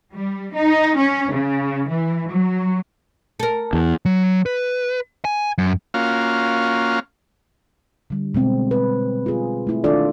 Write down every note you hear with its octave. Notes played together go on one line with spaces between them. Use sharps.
G3
D#4
C#4
C#3
E3
F#3
A4 A#4
E2
F#3
B4
G#5
F#2
A#3 C#4 F4 F#4 F5
D3 G3
B2 G#3 C4
B4
F4 G#4
A3 E4
D#3 D4 F4 A4 D5